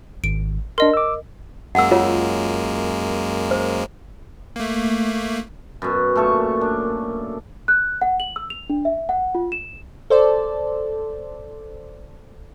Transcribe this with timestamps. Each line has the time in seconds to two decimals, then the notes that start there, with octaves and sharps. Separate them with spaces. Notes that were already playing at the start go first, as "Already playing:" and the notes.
0.24 G#1 D7
0.78 D4 A#4 D#5 C6
0.94 D6 E6
1.75 F#2 G#3 A#3 F#5 E6
1.91 F4 A#4 C#5
3.51 C5
4.56 A3 A#3
5.82 F#2 B2
6.16 A#2 A3 A4 C#6
6.61 D4
7.68 F#6
8.02 F#5
8.20 F#7
8.36 E6
8.50 F7
8.70 D4
8.85 E5
9.09 F#5
9.35 F4
9.52 E7
10.10 A4 C5 D5